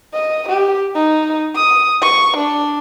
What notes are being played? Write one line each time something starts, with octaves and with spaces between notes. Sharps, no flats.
D#5
G4
D#4
D#6
C#6
D4